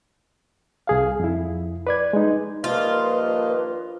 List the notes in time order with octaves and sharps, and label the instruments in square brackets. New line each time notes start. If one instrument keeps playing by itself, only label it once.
[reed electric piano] C2 G#4 F5
F2 E4
B4 D5 G#6
G#3 D#4
[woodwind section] G2 D#3 F3 [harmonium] A#3 D#5 [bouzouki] F4 [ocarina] B4